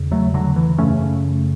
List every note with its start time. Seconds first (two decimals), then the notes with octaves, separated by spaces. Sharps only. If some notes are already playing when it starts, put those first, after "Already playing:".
Already playing: E2 C#3
0.11 F#3 A3
0.34 D3 F#3
0.56 E3
0.78 F#2 C#3 A3 C#4